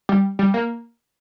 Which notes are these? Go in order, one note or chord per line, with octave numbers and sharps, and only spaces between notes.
G3
G3
A#3